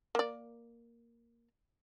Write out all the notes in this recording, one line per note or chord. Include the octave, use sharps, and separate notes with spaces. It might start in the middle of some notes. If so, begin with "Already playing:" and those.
A#3 D5